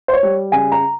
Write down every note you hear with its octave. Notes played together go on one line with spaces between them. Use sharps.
C5
C#5
G3
C#3 G#5
A#5